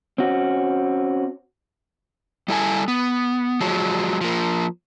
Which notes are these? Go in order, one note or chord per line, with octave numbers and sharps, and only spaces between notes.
C4 C#4 F#4
G3 E4 A4 G#5
B3
F3 F#3 G#3
F3 A#3